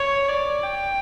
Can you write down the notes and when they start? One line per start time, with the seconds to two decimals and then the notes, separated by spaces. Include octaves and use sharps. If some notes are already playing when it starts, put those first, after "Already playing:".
Already playing: C#5
0.28 D5
0.63 G5